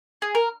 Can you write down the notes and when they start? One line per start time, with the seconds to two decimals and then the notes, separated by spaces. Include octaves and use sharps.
0.22 G#4
0.35 A#4